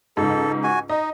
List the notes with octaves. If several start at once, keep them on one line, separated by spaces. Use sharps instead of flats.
C#2 G#2 A4
F#4 G#5
D#4 D#5